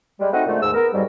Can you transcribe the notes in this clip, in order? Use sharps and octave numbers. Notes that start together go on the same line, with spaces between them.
G3 G#3
A3 C4 D#4 F#4 D#5 F#5
A#2 D3 F3 G#3 A3
D#2 G#2 E6
B3 A#4
F2 G#2 F#3 G3